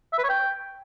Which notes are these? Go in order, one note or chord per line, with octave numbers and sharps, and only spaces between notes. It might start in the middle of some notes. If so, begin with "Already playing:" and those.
E5
B4
C#5
G5